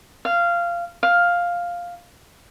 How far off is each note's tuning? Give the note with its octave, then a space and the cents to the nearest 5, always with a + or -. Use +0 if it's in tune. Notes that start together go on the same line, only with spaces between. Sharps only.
F5 -15
F5 +5